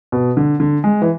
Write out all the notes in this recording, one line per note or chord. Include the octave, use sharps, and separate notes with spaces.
B2
D3
D3
G#3
E3